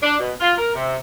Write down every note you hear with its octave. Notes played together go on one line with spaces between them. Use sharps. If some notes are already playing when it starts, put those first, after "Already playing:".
D4
B2
F4
A#4
C3